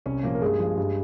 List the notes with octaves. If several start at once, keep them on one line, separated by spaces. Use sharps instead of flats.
C2 C#4 C#5
A#2 F3 A#3 A#4
A#4
G2 G#3 G#4
F3
G2